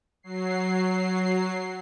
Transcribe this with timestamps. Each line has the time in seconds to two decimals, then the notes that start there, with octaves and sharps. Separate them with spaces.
0.23 F#3 C7